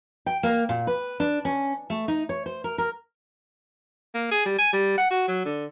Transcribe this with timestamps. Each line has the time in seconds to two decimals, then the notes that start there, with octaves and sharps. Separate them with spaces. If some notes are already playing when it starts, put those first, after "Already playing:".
0.26 G5
0.43 A#3
0.69 A#2
0.87 B4
1.20 D4
1.45 C#4
1.90 A3
2.08 D#4
2.29 C#5
2.46 C5
2.64 A#4
2.78 A#4
4.14 A#3
4.31 G#4
4.45 G3
4.59 G#5
4.73 G3
4.98 F#5
5.11 F#4
5.28 F#3
5.45 D3